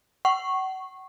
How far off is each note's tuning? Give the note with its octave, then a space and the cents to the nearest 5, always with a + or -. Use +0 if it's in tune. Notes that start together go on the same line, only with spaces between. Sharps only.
F#5 +35 C#6 -15